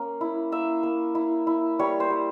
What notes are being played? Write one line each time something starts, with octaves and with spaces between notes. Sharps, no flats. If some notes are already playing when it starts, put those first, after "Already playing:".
Already playing: A#3 C#4
E4
A#3 E5
A#3
E4
E4
G3 C#5
C5
G3